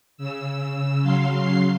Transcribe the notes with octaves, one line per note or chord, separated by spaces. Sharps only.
C#3 E6
C#3 F#3 F5 C6 C7